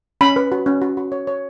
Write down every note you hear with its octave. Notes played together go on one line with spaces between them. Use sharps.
C#4 B5
B4
F#4
C#4
F#4
F#4
C#5
C#5